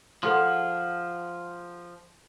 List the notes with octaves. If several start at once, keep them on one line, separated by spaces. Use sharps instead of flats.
F3 G#4 A4 F#5 A5 C6